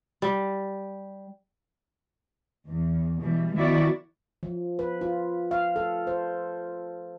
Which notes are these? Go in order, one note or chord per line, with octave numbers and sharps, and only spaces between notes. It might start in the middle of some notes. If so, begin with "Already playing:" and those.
G3
E2
B2 E3 G3
D#3 F3 B3 E4 F#4 D5
F3
B4
F4
F5
A4
C5